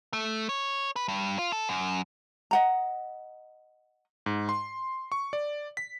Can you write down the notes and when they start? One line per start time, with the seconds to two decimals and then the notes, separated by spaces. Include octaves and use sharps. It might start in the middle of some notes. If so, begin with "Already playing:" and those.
0.13 A3
0.49 C#5
0.96 B4
1.08 G2
1.39 F4
1.52 A4
1.69 F#2
2.51 D#5 F#5 A#5
4.26 G#2
4.49 C6
5.12 C#6
5.33 D5
5.77 B6